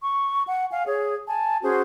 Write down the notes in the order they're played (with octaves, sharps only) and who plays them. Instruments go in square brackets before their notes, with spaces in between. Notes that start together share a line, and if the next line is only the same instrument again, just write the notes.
[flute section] C#6
F#5
F5 G#5
G#4 C#5
G#5 A5
C#4 F#4 G#4 C5